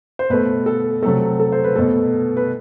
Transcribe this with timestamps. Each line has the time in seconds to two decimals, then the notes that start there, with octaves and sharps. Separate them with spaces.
0.19 C5
0.30 B2 A3 B4
0.66 A4
1.03 C3 F#3 A3 A4
1.40 A4
1.52 C5
1.64 B4
1.75 B2 A3 A4
2.37 B4